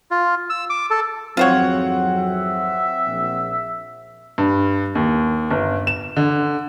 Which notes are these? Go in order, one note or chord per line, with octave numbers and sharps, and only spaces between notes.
F4
E6
D6
A4
G#1 F2 F#3 C4 F4 C5 C#5 F#5
E5
A#1
G2
D#2
G1
E7
D3